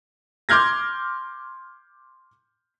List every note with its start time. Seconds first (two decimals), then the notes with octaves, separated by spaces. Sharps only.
0.49 C6 D6 F6 G6 G#6 A#6